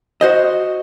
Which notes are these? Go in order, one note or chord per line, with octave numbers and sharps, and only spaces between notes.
F#4 C5 D#5